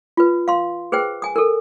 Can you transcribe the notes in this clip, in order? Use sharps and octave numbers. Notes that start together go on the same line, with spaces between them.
F4 B4
F5 C6
G#4 B4 C5 G5
G#5 D#6
A4 A#4